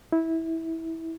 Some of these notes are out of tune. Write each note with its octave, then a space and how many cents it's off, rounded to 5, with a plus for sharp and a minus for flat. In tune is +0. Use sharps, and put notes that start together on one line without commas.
E4 -20